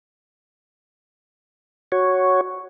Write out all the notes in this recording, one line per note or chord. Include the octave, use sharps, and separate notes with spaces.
F#4 C#5